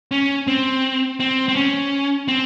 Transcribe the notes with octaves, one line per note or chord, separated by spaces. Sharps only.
C#4
C4
C4
C4
C#4
C4